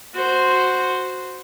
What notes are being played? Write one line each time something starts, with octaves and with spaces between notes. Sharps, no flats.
F#4 C5